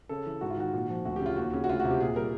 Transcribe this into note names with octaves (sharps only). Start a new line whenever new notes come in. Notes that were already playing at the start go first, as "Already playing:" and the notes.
C#3 A4
E3
G#2 F#4
F4
D#3 F#4
A#2
F3
D2 F#4
G4
C#3 F4
D#2 F#4
C#3
F#4
D2 F4
C3 F#4
G4
A#2 G#4
G3 A#4